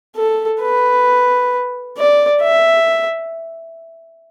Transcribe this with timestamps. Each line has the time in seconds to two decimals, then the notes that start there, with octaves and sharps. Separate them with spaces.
0.16 A4
0.62 B4
1.97 D5
2.42 E5